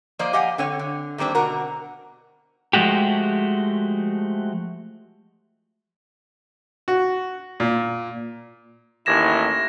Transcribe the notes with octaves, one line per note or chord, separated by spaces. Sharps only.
F3 A#3 C5 D5 D#5
G4 D#5 F5 F#5 G#5
D3 C4 C#5
D3
D#3 G3 A#3 C4 D4
B2 D3 F#4 A#4
F3 G#3 A3 F#4 G4
F#4
A#2
A1 D#2 E4 G#6 A#6 E7